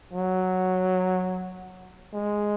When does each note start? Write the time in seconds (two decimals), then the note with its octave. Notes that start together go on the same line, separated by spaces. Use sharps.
0.13 F#3
2.14 G#3